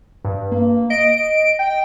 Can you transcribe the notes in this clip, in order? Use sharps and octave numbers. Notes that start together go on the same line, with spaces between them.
G2
A#3
D#5 D7
G5